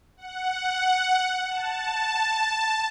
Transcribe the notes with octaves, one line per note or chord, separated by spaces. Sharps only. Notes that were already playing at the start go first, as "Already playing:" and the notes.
F#5
A5